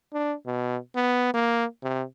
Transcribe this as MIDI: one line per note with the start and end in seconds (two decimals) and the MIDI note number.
0.14 0.33 62
0.46 0.77 47
0.96 1.31 59
1.34 1.65 58
1.83 2.03 48